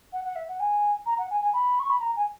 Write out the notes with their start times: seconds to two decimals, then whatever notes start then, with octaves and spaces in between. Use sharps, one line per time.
0.13 F#5
0.24 F#5
0.36 E5
0.48 F#5
0.60 G#5
1.06 A#5
1.18 F#5
1.30 G#5
1.42 G#5
1.53 B5
1.79 C#6
1.90 B5
2.00 A#5
2.16 G#5